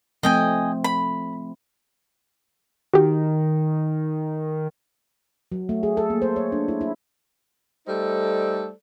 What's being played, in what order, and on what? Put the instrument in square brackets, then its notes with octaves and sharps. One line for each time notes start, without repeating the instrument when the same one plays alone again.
[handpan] F3 A3 C4 [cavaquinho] D#5 G5 G#5
[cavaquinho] B5
[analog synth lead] D#3 [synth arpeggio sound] F#4 G4
[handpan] F#3
A3
G#4
A4
A#3
C5
C#5
D4
E4
E4
[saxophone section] G3 A3 D#4 A4 C5 D5